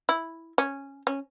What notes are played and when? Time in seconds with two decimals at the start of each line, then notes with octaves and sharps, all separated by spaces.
0.09 E4
0.58 C#4
1.07 C#4